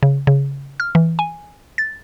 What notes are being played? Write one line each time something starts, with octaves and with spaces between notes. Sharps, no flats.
C#3
C#3
F6
E3
G#5
A6